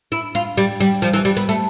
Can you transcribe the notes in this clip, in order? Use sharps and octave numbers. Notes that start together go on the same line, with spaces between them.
E4
F4
G3
G3
F3
E3
G3
B3
A3